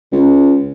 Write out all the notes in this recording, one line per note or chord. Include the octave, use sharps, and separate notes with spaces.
C#2